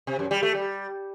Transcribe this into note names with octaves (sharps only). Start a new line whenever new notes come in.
C3
F#2
G3
A3
G3